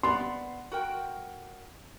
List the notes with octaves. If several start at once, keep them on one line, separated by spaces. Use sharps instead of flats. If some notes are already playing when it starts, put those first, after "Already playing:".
B3 D5 C6
F#4 A#4 G5